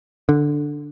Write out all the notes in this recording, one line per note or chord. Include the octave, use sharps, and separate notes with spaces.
D3